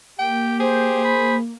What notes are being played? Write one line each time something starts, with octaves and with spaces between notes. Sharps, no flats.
A#3 G4 G5
G#4 C5
B5